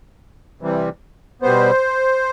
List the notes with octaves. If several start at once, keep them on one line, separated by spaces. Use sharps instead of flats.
C3 E3 G3
B2 G3 B3 C5